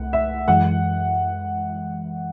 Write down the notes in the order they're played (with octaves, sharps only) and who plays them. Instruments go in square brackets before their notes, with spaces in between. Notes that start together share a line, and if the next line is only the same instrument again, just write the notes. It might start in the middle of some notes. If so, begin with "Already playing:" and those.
Already playing: [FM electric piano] C2 A3 [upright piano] F#5
[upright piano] E5
[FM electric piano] F#2 E3 G#3 [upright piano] F#5